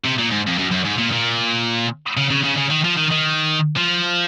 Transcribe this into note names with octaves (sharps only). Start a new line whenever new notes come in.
C3
A#2
G#2
F2
F#2
F#2
G#2
A#2
A#2
C#3
C#3
C#3
C#3
D#3
F3
D#3
D#3
F3